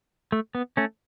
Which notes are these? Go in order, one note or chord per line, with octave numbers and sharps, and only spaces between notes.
A3
B3
A3 C#4